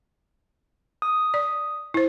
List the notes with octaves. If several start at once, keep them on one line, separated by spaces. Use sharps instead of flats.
D#6
D5
E4 C5